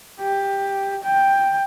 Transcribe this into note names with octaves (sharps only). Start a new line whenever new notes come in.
G4
G5